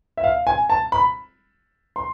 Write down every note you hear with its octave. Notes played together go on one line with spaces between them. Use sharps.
E5
F5
G#5
A5
B5
C6